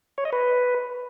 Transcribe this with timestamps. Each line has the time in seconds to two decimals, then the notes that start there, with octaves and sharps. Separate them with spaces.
0.18 C#5
0.25 D#5
0.33 B4